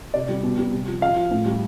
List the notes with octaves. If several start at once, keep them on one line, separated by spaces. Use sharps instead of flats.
C3 D5
G3
B2
G3
C3
F3
F3 F5
F3
A2
G3